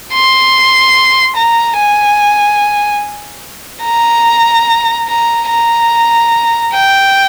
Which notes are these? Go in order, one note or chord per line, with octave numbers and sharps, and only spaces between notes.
C6
A#5
G#5
A#5
A#5
A#5
G5